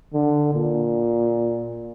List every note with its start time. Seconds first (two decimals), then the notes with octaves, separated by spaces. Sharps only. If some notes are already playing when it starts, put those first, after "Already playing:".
0.14 D3
0.54 A#2